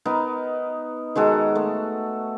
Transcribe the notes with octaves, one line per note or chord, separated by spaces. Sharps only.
B3 D#4 A#4
D#3 G#3 F#4 A4
A3